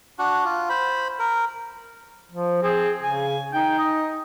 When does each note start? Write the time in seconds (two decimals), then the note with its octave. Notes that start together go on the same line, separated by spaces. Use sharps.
0.19 D4 F#4 F#5
0.45 F4
0.69 C5 B5
1.19 A#4
2.31 F3
2.63 C4 G#4
3.03 C#3 G#5
3.53 D#4 G5
3.78 D#5